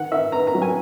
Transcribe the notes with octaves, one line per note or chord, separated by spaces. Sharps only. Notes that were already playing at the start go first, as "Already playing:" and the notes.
Already playing: D#3 F#5
D#3 E5
B3 A#5
A#5
F#3
G#5